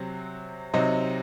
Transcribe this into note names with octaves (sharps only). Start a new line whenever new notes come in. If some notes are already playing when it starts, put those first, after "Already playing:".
Already playing: C3 F#3 C4
C3 F#3 C4 D#4